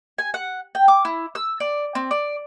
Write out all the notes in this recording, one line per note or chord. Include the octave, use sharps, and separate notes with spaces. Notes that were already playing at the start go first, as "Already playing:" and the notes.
G#5
F#5
G5
D6
E4
E6
D5
C4
D5